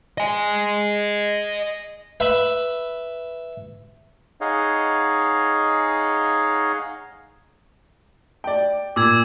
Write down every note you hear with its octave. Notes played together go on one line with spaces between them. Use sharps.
D#5 G#5
B4 E5
D#4 G#4 C#5 D#5 F5 F#5
D5 G5
A#2 D6 E6 G#6